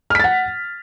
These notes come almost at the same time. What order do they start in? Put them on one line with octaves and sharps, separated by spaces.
F6 B6 A6 F#5